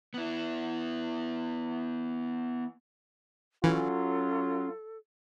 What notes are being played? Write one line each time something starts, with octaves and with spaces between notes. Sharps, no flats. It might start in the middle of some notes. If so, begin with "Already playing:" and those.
B3 E4
E3 F#3 C#4 F4 A4